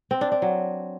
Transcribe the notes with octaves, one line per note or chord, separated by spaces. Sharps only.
C4
D4
D4
F#3